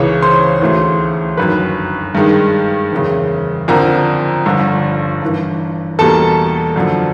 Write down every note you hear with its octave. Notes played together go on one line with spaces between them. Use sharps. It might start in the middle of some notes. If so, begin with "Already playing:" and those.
Already playing: C#2 C#3 E3 C#5
C5 C6
D2 C#3 E3 A3
G1 F#2 D#3 B4 B5
G2 D#3 G#3
F#1 E2 C#3
F2 D3 F3 A#4 A#5
G1 G2 D3 F3
G1 G2 E3
E2 B2 G3 A#3 A4 A5
F#2 D3 F3